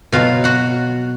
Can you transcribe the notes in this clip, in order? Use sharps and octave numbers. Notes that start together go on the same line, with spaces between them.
B2 F#3 F4 F5
F#4 F#5